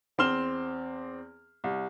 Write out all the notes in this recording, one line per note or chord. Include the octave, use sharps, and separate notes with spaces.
E2 C4 C6 F6 E7 G7
C2